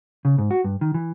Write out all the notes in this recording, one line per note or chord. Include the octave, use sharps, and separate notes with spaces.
C#3
G#2
F#4
G2
D#3
E3